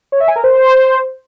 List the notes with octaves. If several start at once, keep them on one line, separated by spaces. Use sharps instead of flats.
C#5
E5
G#5
A#4
C5